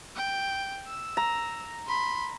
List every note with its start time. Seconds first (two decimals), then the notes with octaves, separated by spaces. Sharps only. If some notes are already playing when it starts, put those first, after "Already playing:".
0.16 G5
0.87 E6
1.17 A#5
1.87 B5 C6